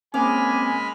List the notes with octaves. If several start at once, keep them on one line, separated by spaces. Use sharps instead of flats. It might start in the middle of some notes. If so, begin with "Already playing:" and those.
G#3 A#3 C4 C#4 G#5 B5 D6 F6